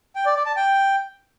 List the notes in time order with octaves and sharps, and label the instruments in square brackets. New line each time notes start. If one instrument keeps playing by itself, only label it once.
[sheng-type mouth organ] G5
D5
D5
A5
G5